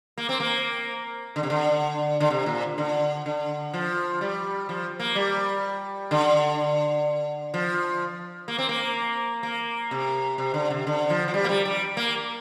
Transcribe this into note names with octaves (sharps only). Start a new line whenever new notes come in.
A#3
C4
A#3
D3
C3
D3
D3
C3
A#2
D3
D3
F3
G3
F3
A#3
G3
D3
F3
A#3
C4
A#3
A#3
C3
C3
D3
C3
D3
F3
F3
G3
A#3
G3
G3
A#3